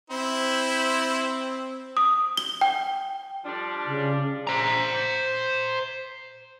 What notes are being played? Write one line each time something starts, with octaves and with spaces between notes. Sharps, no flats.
C4 E4 C5
D#6
G7
G5
F3 G3 D4
C#3
C5 A#5